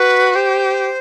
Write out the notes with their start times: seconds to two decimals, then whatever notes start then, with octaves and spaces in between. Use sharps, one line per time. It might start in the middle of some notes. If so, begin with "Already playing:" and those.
Already playing: F#4 B4
0.35 G4 C5